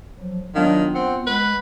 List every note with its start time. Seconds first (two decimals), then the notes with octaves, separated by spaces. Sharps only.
0.19 F3 F#3
0.55 D#3 F#3 B3 D4 F4 F5
0.95 C4 F#5
1.27 G#3 B4